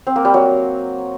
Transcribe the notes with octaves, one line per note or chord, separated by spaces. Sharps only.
C4
A#3
G3
F#3